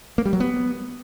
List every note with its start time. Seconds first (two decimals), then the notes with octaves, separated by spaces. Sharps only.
0.18 A#3
0.25 G3
0.33 F#3
0.40 B3